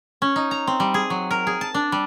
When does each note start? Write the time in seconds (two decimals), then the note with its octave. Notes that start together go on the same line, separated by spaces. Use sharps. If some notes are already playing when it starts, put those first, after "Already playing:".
0.22 C#4
0.36 D#4
0.51 A#5
0.67 C4
0.80 G3
0.94 G#4
1.10 F#3
1.31 A#4
1.47 G#4
1.61 A5
1.74 D4
1.92 G3